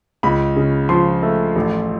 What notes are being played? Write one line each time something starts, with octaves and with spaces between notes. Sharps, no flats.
C#2 B5
C#3
F3 C6
A3
A1